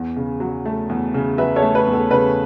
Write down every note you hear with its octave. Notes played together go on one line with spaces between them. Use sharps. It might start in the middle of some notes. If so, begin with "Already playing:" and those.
Already playing: E2
C#3
F#3
A3
E2
C#3
F#3 B4 E5
A4 C#5
A3
B4
E2
A4
C#3 B4